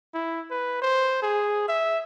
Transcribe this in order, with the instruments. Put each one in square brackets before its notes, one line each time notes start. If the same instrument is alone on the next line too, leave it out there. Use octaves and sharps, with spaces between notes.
[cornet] E4
B4
C5
G#4
E5